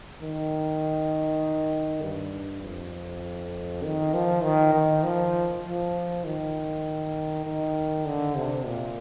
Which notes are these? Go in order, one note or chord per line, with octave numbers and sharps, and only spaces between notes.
D#3
G2
F2
D#3
F3
D#3
D#3
F3
F3
D#3
D#3
D3
C3
A#2